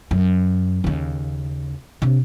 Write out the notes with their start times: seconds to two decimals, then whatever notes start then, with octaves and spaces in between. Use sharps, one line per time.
0.11 F#2
0.84 D#2 C#3
2.02 C3 D4